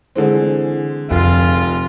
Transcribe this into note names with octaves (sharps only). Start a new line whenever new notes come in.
D3 E3 G#3 C4
F1 F2 F4